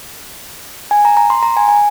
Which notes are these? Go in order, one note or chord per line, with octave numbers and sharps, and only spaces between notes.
G#5
A#5
A#5
C6
A#5
G#5
G#5